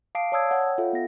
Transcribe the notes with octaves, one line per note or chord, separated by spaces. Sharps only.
F5 A5 D6 D#6 C7 D7
C#5 D5 A5 D#6 E6 G#6
C#5 F#5
F#5 G5
F4 A4 E5 F5
B3 A#6